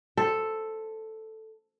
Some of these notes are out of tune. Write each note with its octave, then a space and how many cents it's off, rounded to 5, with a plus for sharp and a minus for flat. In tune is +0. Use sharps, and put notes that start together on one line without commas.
A4 +0 C5 +0